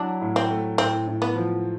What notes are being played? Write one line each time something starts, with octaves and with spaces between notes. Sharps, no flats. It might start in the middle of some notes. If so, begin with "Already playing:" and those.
Already playing: F#3 D4 E4
A2
C4
A3
A2 C4
A2
B3
F3